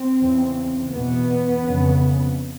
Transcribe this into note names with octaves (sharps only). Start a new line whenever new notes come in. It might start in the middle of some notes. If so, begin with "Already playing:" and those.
Already playing: C4
E2 C#3
E2 B2 B3
F2 C#3